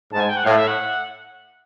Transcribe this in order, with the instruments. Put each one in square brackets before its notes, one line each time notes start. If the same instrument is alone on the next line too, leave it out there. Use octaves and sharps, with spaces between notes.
[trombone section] G#2 [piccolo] A5
[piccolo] G#5
G5
F#5
[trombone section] A2 [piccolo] F5
[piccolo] E5
F#5